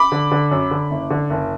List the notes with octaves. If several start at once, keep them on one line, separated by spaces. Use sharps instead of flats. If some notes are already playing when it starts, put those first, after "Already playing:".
Already playing: B5 D6
D3
D3
F#2
D3
F#1
D3
F#1